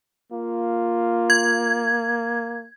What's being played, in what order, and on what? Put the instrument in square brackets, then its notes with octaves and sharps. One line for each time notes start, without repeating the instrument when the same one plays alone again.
[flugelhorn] A#3 [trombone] F4
[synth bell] G#6